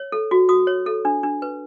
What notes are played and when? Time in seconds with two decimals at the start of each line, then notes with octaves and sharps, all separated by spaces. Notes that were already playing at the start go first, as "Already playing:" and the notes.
Already playing: C#5
0.12 A4
0.31 F#4
0.49 F#4 D#6
0.67 C#5
0.86 A4
1.05 D4
1.23 D4
1.42 B4